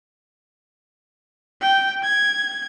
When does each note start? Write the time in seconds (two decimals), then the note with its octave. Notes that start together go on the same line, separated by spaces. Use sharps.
1.62 G5
2.03 G#6